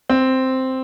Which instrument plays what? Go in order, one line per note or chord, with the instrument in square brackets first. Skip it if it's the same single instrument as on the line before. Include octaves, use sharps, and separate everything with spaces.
[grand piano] C4